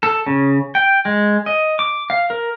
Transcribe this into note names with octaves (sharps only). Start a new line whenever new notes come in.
A4
C#3
G5
G#3
D#5
D6
F5
A#4